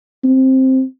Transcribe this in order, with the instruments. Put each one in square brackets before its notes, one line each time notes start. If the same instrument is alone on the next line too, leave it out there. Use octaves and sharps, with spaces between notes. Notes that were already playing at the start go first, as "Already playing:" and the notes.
[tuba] C4